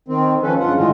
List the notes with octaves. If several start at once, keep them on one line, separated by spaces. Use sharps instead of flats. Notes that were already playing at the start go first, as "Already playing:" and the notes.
D#3 C4
D#3 F3 C#4 A4 B4
G2 C#3 F4 F#5
A2 D3 D#3 G#3 A3 F4